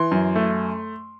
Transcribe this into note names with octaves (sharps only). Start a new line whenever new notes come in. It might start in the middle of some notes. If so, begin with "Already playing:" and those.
Already playing: E3 C6
F#2
A3